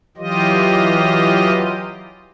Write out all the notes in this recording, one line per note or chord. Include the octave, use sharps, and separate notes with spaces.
E3 F#3 F4 G4 D#5